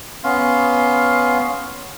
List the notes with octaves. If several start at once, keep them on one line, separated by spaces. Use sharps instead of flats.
B3 C#4 F5 C6